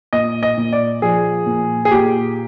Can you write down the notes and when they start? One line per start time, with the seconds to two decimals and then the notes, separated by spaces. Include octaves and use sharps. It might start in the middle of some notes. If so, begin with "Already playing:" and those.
0.13 A#2 D#5
0.43 D#5
0.58 A#2
0.73 D5
1.02 F3 G#4
1.46 A#2
1.85 G#4
1.91 A#2 G4